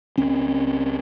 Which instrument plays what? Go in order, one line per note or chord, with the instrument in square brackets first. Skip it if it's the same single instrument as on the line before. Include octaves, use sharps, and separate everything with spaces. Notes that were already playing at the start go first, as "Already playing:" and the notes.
[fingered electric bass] C#2 C4 C#4